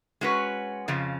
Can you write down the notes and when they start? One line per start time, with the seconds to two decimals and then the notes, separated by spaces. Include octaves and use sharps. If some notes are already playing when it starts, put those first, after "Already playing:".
0.21 G#3 C#4 F#4 B4
0.88 F2 C#3 F3